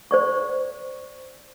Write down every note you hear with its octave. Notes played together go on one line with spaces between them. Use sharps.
C5 D5 C#6